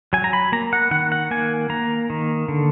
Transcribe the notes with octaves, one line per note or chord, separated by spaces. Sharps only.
F#3 G#5
A#5
B5
A#3 A#5
F#5
D#3 F#5
F#5
A#3 G#5
A#3 A#5
D#3
D3